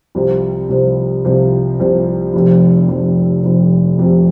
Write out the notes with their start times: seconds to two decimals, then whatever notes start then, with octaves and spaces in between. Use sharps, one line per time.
0.15 C2 C3 F3
0.69 C2 C3 F3
1.25 C2 C3 F3
1.79 C2 C3 F3
2.33 F1 F2 C3
2.88 F1 F2 C3
3.43 F1 F2 C3
3.97 F1 F2 C3